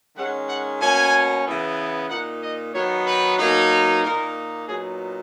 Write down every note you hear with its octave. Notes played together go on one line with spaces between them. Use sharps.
D#3 G#3 C#4 F#5
F#5
B2 A#3 C#4 G#5
C#3 E3 B3
A#2 A#3 D#4 F#5
D#5
D#3 F#3 B3 D#4 C#5
B4
B2 F#3 A#3 D#4
A#2 A#3 D#4 A#4
A#2 F#3 B3 D#4 G#4